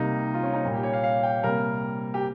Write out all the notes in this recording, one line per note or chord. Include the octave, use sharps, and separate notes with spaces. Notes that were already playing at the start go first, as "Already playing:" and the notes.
Already playing: C3 G3 A#3 D#4
F4
C#4
D#4
A#2 G3 A#3
G4
C#5
F5
F5
G5
C3 G3 A#3 A#4
G4